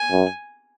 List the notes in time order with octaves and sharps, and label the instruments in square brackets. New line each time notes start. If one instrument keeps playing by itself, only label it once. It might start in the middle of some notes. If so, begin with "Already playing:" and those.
Already playing: [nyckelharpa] G#5
[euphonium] F#2